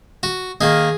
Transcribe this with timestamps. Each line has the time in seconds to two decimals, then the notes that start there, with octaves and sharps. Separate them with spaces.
0.23 F#4
0.61 D#3 A#3 D#4 G#4